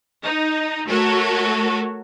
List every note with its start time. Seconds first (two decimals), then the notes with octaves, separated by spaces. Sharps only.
0.23 D#4
0.87 A3 F#4 A4 A#4 C#5